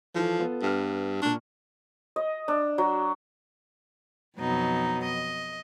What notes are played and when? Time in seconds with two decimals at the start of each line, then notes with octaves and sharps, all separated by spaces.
0.15 E3 F3 A4
0.39 B3 F4 A4
0.62 G2 B3 F6
1.22 A#2 D4 C#6
2.16 D#5
2.48 D4
2.78 F#3
4.37 F2 B2 F#3 D#4
5.03 D#5